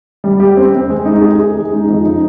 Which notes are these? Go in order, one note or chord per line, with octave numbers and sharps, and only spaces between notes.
G3
G4
C4
C4
G#3
D#4
G#4
G#4
G#3
D#4
F2
D#4